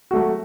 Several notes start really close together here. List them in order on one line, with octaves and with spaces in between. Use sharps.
F#4 A3 F#3